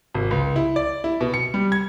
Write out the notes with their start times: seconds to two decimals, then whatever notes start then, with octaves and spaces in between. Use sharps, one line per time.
0.15 G#1
0.31 C#2
0.56 E4
0.76 D5
1.04 E4
1.21 B2
1.34 C#7
1.54 G3
1.72 G#6